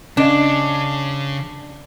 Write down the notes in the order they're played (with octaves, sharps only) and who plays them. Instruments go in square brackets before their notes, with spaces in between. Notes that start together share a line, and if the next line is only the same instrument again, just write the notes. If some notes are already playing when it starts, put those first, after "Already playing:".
[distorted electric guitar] C#3 [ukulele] C#4 D#5 F5 [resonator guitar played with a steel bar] D4